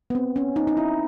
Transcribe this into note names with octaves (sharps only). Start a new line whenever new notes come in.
B3
C4
C#4
D#4
D#4
E4